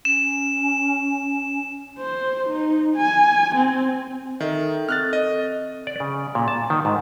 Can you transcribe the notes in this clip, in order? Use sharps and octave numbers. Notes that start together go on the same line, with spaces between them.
C#4 E7
C5
D#4
G#5
C4
D#3 A4 D#5 E5
C4 A4 F6 F#6 A6
D#5
D5
C#3
A#2
A5
D#3
G#2